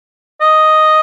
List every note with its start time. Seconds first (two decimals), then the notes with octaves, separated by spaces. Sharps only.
0.41 D#5